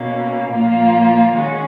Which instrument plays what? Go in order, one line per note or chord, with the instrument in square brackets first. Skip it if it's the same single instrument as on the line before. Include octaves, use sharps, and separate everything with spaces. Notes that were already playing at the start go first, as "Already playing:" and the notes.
Already playing: [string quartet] B2 A#3 C#4
A#2 F3 A#3 F4
D#3 G#3 C#4 F#4